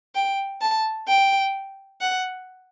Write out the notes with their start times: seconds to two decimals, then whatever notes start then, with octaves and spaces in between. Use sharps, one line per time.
0.15 G5
0.61 A5
1.08 G5
2.01 F#5